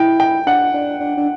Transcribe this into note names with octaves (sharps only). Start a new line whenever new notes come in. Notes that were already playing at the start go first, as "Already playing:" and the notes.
Already playing: E4 G5
G5
D4 F#5
D4
D4
D4